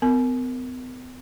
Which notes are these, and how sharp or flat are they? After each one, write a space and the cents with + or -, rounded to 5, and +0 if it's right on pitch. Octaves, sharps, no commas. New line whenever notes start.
B3 +40 A#4 -20